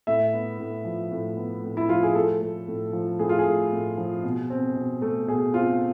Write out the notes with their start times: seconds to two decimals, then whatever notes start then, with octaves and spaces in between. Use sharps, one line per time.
0.07 A2 E5
0.33 B3
0.59 A2
0.85 F3
1.12 A2
1.37 B3
1.64 A2
1.77 E4
1.89 F3 F4
2.03 G#4
2.15 A2 A4
2.41 A3
2.68 A2
2.93 F3
3.19 A2 G#4
3.29 F4
3.39 G#4
3.46 A3
3.72 A2
3.98 F3
4.23 B2
4.50 C4
4.76 B2
5.02 A3
5.28 B2 G#4
5.54 C4 F4